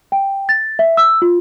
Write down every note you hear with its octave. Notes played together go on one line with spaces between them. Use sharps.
G5
A6
E5
E6
F4